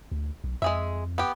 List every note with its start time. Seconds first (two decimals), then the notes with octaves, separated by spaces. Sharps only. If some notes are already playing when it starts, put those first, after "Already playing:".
0.12 D2
0.44 B1
0.62 F2 G#3 G#4 E5
1.18 B3 G4